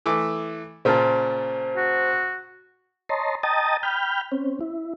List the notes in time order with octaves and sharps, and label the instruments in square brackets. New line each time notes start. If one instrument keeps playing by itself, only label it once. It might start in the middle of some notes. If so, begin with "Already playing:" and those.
[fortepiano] E3 A3 D6
[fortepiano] A#2 C#3 [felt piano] C5 A5
[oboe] F#4
[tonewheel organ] C#5 D#5 A5 A#5 C6
D#5 G5 A5 A#5 D#6 A6
G5 B5 F6 G6
C4 C#4
E4